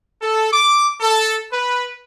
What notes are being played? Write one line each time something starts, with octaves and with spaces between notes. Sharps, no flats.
A4
D6
A4
B4